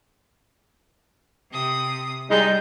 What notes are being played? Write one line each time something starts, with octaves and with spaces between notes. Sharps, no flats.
C3 D#6
G3 G#3 D#4 G6